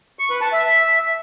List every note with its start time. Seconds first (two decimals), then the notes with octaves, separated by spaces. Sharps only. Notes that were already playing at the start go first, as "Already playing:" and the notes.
0.19 C#6
0.30 B4
0.41 A5
0.52 E5